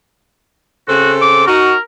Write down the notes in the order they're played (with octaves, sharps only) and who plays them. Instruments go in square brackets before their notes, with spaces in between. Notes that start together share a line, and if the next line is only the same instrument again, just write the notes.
[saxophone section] C#3 C4 A4 [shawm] F#4
[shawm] D6
[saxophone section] D#4 F#4 [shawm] A#4